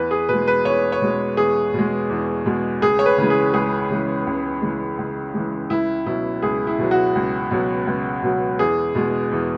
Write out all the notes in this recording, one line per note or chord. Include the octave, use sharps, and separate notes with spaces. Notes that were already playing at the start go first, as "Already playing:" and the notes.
Already playing: E2 B4
G#4
B2 G#3 B4
B4
E2 C#5
C#5
B2 G#3
E2 G#4
B2 G#3
E2
B2 G#3
C#2 G#4
C#5
B4
C#3 E3 G#3
G#4
C#2 G#4
C#3 E3 G#3
C#2
C#3 E3 G#3
C#2
C#3 E3 G#3
C#2 E4
B2 F#3 E4
C#2 G#4
E4
B2 F#3
F#4
C#2
B2 F#3
C#2
B2 F#3
E2 G#4
B2 G#3
E2